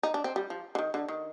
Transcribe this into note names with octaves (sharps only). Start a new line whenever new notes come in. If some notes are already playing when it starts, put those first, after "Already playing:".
D#4
D4
C4
G3
F3
D3
D#3
D3
D#3